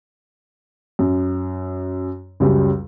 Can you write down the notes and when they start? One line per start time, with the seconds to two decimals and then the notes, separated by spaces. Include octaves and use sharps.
0.99 F#2
2.40 C#2 F#2 G3